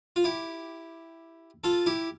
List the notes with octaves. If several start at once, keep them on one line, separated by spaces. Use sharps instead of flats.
F4
E4 G4
F4 A4
E4 G4